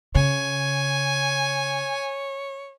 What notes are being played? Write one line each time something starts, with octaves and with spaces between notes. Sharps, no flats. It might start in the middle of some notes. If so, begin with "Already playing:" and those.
C#3 C#5 G#5